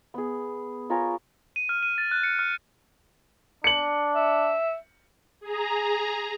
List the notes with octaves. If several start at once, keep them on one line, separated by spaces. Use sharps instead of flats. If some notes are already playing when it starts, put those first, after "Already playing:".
B3 G#4
F4 A#4 C#5 G#5
D#7
F6
D#7
A6
F#6
C#7
F6
D4 C#7 F#7
E5
G#4 A#5